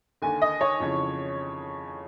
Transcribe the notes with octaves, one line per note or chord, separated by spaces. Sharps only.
D#2 D3 G#5
D#5
C#5
F2 C#3 E3